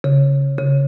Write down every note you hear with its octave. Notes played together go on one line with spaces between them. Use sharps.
C#3
C#3